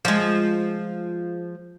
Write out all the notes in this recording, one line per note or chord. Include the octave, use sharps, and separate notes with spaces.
F3 G#3